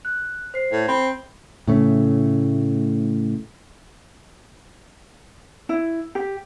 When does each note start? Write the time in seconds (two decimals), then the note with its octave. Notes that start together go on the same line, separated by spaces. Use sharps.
0.05 F#6
0.54 C5 C7
0.72 A2
0.88 C4 B5
1.68 A2 C#3 A3
5.69 E4
6.15 G4